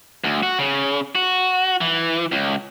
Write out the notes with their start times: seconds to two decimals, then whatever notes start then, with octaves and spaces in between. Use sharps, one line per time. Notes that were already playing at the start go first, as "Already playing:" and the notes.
0.24 D2
0.43 F#4
0.59 C#3
1.15 F#4
1.81 E3
2.32 C#2